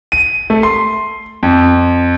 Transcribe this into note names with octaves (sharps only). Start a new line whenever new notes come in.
D#7
A3
C6
F2